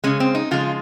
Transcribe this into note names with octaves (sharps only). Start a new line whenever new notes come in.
C#3 G#3 C#4
C4
D#4
C#3 F3 G#3 F4